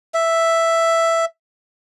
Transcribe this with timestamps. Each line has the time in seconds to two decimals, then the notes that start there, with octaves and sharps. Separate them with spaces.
0.14 E5